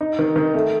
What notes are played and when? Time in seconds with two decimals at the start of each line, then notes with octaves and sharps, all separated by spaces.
0.01 D#4
0.19 D#3
0.36 D#3
0.54 A3